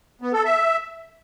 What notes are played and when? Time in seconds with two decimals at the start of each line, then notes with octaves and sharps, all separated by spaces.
0.22 B3
0.33 A4
0.45 E5